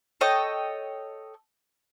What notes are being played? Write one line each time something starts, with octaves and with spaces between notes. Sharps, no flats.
A4 C#5 D#5 G5